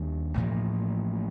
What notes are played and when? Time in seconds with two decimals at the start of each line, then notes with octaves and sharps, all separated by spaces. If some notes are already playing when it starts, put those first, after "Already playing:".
Already playing: D#2 D#3 G3 D4
0.35 A1 A2 F3 A#3